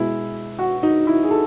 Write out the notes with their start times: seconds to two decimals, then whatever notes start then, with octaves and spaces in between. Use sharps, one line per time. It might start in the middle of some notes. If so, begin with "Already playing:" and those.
Already playing: B2 G#3 B3 E4
0.59 F#4
0.83 D#4
1.07 E4
1.23 G#4
1.31 A4